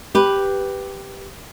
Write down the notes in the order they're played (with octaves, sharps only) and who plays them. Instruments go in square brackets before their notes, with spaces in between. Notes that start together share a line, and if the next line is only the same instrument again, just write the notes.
[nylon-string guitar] G4 B4